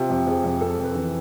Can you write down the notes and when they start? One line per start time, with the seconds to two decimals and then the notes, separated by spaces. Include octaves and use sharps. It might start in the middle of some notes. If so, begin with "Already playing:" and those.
Already playing: C3 F4
0.10 F2
0.27 F2 G#4
0.44 F2
0.61 F2 A4
0.77 F2
0.83 B4
0.95 E3